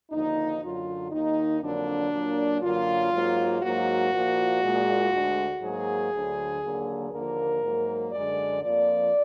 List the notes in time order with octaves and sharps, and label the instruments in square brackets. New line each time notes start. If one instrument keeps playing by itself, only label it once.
[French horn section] D#2 D3 F3 A#3 D#4
F#2 D3 F#3 F4
D#2 D#3 A#3 D#4
F2 D3 F#3 A#3 D4
A#2 F#3 A#3
F#2 D3 F#3 A#3 F4
G#2 F#3 A#3
G#2 F#3 A#3 F#4
A#2 F3 A#3
A#2 G#3
D2 D3 G#3
G#2 F#3 A#3 G#4
D2 D3 F#3
D#2 D3 F#3 A#3
D#2 D3 F3 A#3 A#4
G#2 F#3 A#3
F#2 D3 G#3 D5
F2 F3 A#3 D5